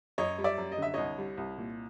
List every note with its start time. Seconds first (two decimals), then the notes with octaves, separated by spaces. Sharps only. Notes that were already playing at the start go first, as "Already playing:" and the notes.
0.18 F#2 C#5 D#5
0.38 G3
0.44 D5 E5
0.58 F#2
0.72 D#5
0.78 D3 E5
0.94 C2 C#5 D#5
1.18 G3
1.37 C2
1.58 A#2